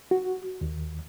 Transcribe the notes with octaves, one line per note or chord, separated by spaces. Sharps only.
F#4
D#2